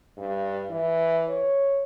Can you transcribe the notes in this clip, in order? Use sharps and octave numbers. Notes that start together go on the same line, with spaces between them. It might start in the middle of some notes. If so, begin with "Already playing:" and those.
G2
E3
C#5